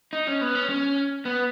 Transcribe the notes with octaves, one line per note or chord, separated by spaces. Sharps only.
D#4
C#4
B3
C#4
C#4
B3